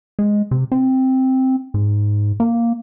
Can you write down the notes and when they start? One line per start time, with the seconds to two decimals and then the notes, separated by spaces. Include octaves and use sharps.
0.19 G#3
0.51 C3
0.72 C4
1.74 G#2
2.40 A#3